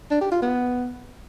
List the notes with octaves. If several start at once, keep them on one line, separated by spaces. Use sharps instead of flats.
D4
G4
F4
B3